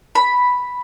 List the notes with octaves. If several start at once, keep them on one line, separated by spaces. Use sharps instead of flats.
B5